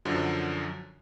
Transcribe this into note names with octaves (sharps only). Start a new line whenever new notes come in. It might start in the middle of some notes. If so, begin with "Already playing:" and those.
F#2 D3 F3 F#3